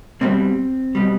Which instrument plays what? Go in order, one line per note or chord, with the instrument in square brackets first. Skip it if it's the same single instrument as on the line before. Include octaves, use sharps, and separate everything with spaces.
[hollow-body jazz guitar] B2 G3 C4
B2 G3